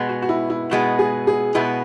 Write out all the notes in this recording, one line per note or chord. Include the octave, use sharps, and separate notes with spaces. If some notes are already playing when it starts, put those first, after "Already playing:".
Already playing: B2 G#3 B3
F#4
F#4
E4
E4
B2 G#3 B3 F#4
G#4
G#4
B2 G#3 B3 E4